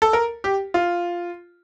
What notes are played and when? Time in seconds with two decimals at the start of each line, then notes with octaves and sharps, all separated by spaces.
0.02 A4
0.13 A#4
0.44 G4
0.74 F4